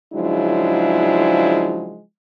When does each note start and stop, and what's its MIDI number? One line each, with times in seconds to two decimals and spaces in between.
0.14 2.01 49
0.14 2.01 53
0.14 2.01 54
0.14 2.01 56
0.14 2.01 62
0.14 2.01 64